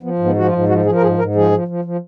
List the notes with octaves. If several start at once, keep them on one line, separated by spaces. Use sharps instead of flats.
F3 B3
G#2
B3
F3 F#4
F4
G#2
F3 F#4
F3 G#4
A#4
G#2 G#4
G#2 A#4
F3 G#4
F3
F3
F3